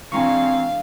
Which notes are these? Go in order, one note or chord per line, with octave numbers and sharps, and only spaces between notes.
E3 G#3 C4 D4 F5 G#5 A#5 C#6